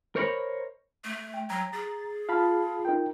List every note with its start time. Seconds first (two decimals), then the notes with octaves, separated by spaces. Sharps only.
0.16 A#4 C5 C#5 D#5 A#5 B5
1.04 A3
1.34 G5
1.50 F#3 A#5
1.73 G#4 A6
2.29 F4 F5 A5 B5
2.85 D#4 A#4 G5